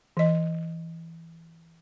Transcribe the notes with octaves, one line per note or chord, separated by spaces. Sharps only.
E3 D#5